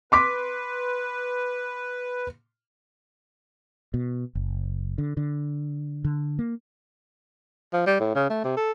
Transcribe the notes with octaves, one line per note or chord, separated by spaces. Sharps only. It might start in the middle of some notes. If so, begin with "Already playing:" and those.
B4 C6 D6 B6
B2
F#1
D3
D3
D3
A#3
F3
G3
A2
C#3
A3
C3
A4